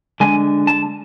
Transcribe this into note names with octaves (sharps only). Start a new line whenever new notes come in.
D3 G#3 D4 G#5
A5